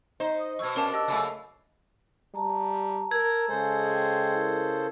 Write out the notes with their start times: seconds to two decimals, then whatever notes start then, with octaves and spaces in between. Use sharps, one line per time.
0.20 D#4 C5
0.40 D#5
0.59 F2 B2 C#6 E6 G#6
0.76 C#4 D4 A#4 F5 A5
0.94 G4 D#5 E6
1.08 C#3 F#3 A3
2.35 G3 A5 A#5
3.11 A#4 E6 G#6
3.49 C#3 G#3 A4 C5 G#5
3.94 G5
4.35 E4 A#4